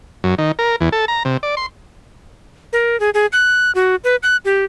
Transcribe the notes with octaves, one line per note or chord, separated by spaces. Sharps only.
F#2
D#3
A#4
E2
A4
A#5
C3
D5
C6
A#4
G#4
G#4
F#6
F#4
B4
F#6
G4